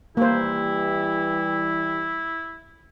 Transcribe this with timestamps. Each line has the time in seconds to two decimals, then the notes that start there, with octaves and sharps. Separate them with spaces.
0.17 E3 G3 A#3 E4 G4 C5